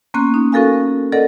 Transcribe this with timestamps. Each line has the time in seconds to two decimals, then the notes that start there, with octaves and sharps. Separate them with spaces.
0.14 A#3 B3 C#4 C6 F#6
0.34 D#4
0.52 C#4 F#4 A4 A#4 F5 G#5
1.12 A4 A#4 D5 D#5 F#5